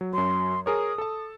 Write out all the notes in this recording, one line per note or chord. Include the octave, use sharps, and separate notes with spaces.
F#3
F#2 F#3 C6
G#4 A#4 C#5 D#6
A4 A5